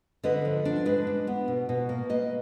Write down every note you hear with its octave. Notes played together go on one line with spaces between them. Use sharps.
D3 B4 D#5
F3
D4
G#3 B4 D#5
D4
B3
B2
B2
A#3
A#3 B4 D#5